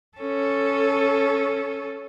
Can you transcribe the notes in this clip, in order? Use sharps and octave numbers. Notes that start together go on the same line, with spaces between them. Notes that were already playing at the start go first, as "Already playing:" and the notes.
C#4 A4